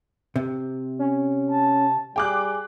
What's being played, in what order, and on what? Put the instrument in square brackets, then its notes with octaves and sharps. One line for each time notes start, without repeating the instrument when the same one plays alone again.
[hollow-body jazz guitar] C3
[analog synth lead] C#4
[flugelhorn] A5
[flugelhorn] G3 [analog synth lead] G#4 [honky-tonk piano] G5 D6 F#6